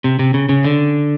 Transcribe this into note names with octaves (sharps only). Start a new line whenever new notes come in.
C3
C3
C#3
C#3
D3